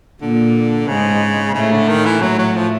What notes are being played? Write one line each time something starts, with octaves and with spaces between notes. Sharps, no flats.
A#2 D3 A#3
G#2 C#3 G#3
A2 C#3 A3
D3
D#3
E3
A2 F#3 A3
F#3
F3